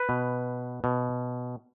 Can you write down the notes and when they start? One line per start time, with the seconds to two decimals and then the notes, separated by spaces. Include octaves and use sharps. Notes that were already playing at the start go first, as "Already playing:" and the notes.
Already playing: B4
0.09 B2
0.84 B2